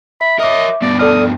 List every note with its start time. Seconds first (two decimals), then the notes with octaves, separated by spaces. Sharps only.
0.21 E5 B5
0.40 A#4 C#5 D#5 E5 D6
0.82 G2 B2 B3 D5
0.99 A4 D5 D#6 F6